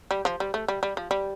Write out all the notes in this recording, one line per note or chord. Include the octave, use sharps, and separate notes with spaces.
G3
F3
G3
A3
G3
G3
F3
G3